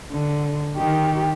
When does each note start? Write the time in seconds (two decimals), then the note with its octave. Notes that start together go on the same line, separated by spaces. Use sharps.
0.12 D3
0.77 D#3 G4